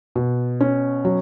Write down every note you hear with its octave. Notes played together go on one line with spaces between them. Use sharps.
B2
C#4
F#3